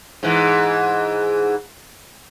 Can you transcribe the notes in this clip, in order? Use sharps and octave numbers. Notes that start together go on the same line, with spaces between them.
G#2 E3